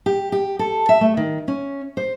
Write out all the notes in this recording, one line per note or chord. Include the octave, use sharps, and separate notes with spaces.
G4
G4
A4
E5
A3
D#3
C#4
C5